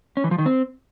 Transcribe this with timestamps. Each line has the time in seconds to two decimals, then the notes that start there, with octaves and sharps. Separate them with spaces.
0.17 C#4
0.24 E3
0.31 F3
0.38 D#3
0.46 C4